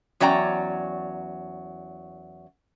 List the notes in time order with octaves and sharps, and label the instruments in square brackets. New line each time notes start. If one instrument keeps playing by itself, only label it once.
[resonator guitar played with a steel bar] E2 F#3 C#4 D5 G5 A#5